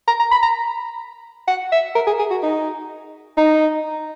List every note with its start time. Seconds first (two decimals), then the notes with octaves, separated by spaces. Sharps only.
0.08 A#5
0.20 A#5
0.31 B5
0.43 A#5
1.48 F#5
1.72 E5
1.95 A#4
2.07 G#4
2.19 G#4
2.31 F#4
2.43 D#4
3.37 D#4